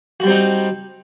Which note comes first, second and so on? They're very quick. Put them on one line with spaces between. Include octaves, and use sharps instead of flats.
F#4 G3 C4 D#4